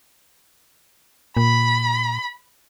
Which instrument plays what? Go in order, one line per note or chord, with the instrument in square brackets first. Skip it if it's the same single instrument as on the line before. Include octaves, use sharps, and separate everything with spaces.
[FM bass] A#2 [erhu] B5